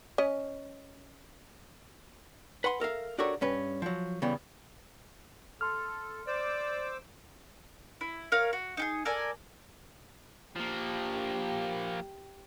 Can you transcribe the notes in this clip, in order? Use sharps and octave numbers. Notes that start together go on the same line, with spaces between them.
C#4 D#5
B4 F#5 G#5 B5 C6
A4 A#4 E5 F5
D4 F#4 G4 A4 A#4 C#5
G2 C#4 B4
F3 F#3
C#3 E3 G3 B3
A4 C6 F6
C5 D5 D6 E6
E4
A#4 C#5 F5
F#4
D#4 G4 G#4
A4 A#4 D5 G#5
F3 A#3 G4